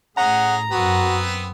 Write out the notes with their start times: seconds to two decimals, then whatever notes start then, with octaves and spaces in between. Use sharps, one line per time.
0.17 A2 C#4 G#4 F#5 A#5
0.72 F#2 B3 C4 F#4 B4